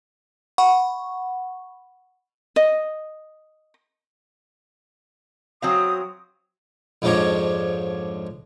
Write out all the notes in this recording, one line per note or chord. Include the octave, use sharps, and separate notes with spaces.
F#5 B5 C#6
D#5
F#3 C4 F5 D#6
F2 G#2 F3 G#3 D4 C#5